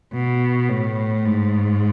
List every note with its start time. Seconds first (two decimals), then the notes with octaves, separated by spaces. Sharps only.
0.13 B2
0.69 A2
1.25 G#2